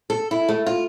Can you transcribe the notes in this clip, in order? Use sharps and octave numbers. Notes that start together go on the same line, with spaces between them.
A4
E4
A3
F4